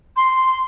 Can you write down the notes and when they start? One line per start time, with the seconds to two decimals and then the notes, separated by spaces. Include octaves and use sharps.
0.16 C6